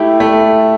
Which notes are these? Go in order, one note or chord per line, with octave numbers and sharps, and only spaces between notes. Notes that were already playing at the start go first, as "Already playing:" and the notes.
Already playing: A3 E4 G4
A3